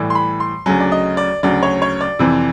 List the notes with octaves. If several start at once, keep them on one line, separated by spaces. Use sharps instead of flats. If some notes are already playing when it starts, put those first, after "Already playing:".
Already playing: A2 E3 G3
C6
B5
C6
D2 C#3 F#3 G#5
D5
D#5
D5
D2 C#3 F#3 D5
C#5
C#5
D5
F2 C3 E3